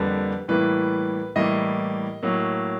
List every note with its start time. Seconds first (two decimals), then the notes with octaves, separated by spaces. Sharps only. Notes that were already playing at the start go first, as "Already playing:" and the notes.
Already playing: F2 D3 G3 A#3 B4
0.48 A2 E3 G3 A#3 B4
1.36 A2 E3 G3 A#3 D#5
2.23 A2 F#3 A#3